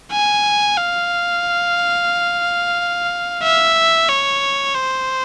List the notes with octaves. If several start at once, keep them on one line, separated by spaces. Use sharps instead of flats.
G#5
F5
E5
C#5
C5